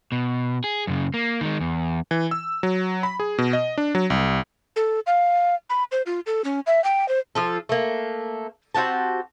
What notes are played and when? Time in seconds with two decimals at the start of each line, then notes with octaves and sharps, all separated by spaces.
0.12 B2
0.64 G#4
0.87 F#2 C#3
1.14 A#3
1.41 D#3 G#3
1.60 E2
2.11 E3
2.31 E6
2.63 F#3
3.03 B5
3.20 G#4
3.38 B2
3.53 D#5
3.78 D4
3.95 F#3
4.10 C2
4.76 A4
5.07 F5
5.70 B5
5.92 C5
6.06 F4
6.26 A4
6.44 C#4
6.67 E5
6.84 G5
7.09 C5
7.35 F3 F4 A4
7.69 A3 A#3
8.75 C4 F#4 G4 A5